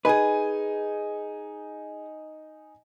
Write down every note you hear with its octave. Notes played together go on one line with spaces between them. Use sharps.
D#4 G#4 B4 G#5